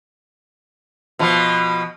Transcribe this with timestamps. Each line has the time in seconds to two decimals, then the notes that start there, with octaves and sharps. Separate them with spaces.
1.19 B2 F3